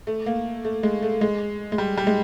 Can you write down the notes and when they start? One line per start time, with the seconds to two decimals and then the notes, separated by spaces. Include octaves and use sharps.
0.07 A3
0.26 A#3
0.65 A3
0.83 G#3
1.02 A3
1.21 G#3
1.72 G#3
1.78 G3
1.97 G3
2.07 G#3